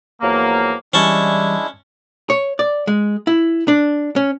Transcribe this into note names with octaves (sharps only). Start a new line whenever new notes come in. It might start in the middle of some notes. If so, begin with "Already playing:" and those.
E2 F3 F#3 A#3
E3 G3 G#3 C#4 D4 E4 A5 C#6
C#5
D5
G#3
E4
D4
C#4